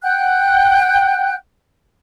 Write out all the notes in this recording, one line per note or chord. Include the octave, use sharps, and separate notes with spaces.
F#5 G5 F#6 G6